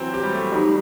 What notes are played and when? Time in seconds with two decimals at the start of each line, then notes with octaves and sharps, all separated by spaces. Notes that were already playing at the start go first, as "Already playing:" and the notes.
Already playing: E3 F#3 C4
0.14 G4
0.23 G3
0.33 A3
0.52 F#3 G3 D#4 G4